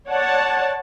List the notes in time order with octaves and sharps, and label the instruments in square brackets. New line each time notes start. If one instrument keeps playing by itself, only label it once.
[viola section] C#5 D5 F#5 A5